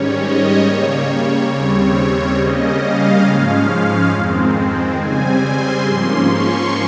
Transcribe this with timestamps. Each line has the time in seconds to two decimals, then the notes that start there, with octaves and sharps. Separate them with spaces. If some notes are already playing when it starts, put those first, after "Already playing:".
Already playing: G#2 D#3 G3 C#4 C#5
0.18 D#5
0.62 C#3 G3 A#3 C#5
1.50 D#2 C#3 G3 C4 C#5
1.93 C#5
2.36 C#3 G3 A#3 C#4 D#5
2.79 F5
3.24 G#2 F3 G#3 C#4 F5
4.10 F2 D#3 G#3 C4
4.97 C#3 G3 C4 G#5
5.40 C6
5.84 G#2 F3 A#3 C#4
6.28 C#6